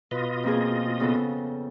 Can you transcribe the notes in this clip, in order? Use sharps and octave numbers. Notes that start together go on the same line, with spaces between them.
B2 F4 B4 D#5
F2 A#3 G#4
C#3 B3 A4